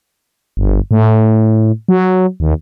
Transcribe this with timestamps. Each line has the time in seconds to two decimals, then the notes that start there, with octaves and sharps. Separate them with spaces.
0.57 G1
0.91 A2
1.89 F#3
2.40 D#2